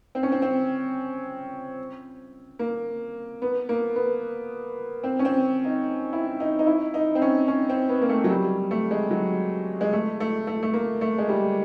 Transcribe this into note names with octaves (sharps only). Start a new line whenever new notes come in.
C4
C#4
C4
C4
A#3
B3
A#3
B3
C4
C#4
C4
D#4
E4
D#4
D#4
E4
D#4
C4
C#4
C#4
C4
B3
A#3
A3
F#3
G3
A3
G#3
F#3
G#3
A3
A3
A3
A3
A#3
A3
G#3
G3